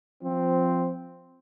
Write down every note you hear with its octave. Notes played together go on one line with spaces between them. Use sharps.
F3 C4